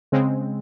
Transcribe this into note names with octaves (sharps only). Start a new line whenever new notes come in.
C#3 G#3 C4